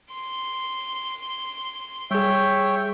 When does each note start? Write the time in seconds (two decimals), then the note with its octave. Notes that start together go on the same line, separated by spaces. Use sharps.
0.11 C6
2.11 G3 G#4 C#5 E5 G5